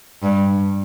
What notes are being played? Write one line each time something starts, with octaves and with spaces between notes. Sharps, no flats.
G2